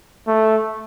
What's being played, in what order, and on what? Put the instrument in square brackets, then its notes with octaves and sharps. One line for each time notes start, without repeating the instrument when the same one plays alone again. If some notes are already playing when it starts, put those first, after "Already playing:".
[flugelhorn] A3